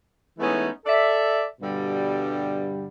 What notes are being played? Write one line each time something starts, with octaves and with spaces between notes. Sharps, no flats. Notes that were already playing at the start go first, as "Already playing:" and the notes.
E3 G#3 A3 B3 C#4 D#4
A4 D5 E5
G2 B2 D3 G3